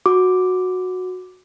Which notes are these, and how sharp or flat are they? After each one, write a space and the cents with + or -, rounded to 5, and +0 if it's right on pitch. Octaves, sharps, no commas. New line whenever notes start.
F#4 -10 D6 +0